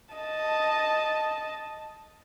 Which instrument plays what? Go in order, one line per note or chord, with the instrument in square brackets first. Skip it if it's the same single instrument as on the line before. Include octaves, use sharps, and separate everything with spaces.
[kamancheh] D#5 A5